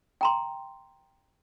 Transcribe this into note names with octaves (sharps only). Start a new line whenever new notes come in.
G5 A#5 C6